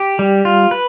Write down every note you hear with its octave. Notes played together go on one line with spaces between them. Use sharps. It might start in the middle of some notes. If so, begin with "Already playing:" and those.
Already playing: G4
G3
F4
B4